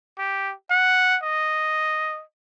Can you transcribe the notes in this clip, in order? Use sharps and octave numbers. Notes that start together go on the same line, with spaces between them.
G4
F#5
D#5